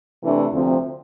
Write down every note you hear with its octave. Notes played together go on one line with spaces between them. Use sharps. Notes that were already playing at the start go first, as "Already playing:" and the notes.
C3 E3 A3 D4
D2 C3 F3 C4